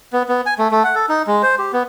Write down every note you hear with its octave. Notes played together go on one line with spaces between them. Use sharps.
B3
B3
G#5
A3
A3
F#5
A4
D#4
G#3
C5
G4
B3